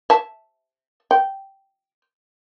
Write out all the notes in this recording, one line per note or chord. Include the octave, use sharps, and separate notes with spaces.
E5 A5
G5